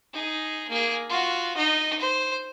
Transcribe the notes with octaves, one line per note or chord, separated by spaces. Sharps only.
D#4 G#4
A#3 G#4
F4 F#4
D#4 D#5
C5